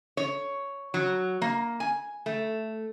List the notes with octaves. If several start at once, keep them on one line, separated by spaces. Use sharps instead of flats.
C#5
F#3
A#3
G#5
A3